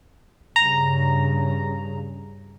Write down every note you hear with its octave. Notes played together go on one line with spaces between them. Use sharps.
G2 C#3 A#5